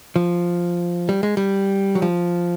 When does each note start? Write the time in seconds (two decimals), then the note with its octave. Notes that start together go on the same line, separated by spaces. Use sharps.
0.16 F3
1.09 G3
1.23 G#3
1.37 G3
1.95 F#3
2.02 F3